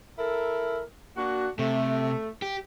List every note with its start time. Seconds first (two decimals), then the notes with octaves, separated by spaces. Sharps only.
0.18 E4 A4 A#4
1.16 A#3 D4 F#4
1.59 C3 A3
2.42 G4